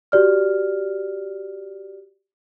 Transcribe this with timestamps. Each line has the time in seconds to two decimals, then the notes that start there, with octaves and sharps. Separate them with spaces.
0.12 F#4 G4 D5 F6